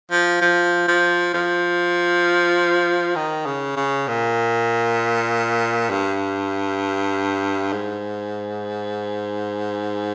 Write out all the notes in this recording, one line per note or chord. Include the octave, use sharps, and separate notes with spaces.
F3
F3
F3
F3
D#3
C#3
C#3
A#2
G2
G#2